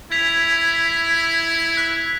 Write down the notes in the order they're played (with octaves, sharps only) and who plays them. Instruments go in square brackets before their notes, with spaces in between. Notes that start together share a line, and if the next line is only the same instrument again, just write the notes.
[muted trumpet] E4 [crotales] G#6 B6 F7
[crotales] F#6 B6